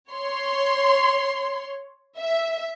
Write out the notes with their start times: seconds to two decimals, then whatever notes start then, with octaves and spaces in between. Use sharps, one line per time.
0.11 C#5 C6
2.19 E5